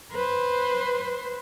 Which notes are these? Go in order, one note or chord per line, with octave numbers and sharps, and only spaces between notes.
B4 C5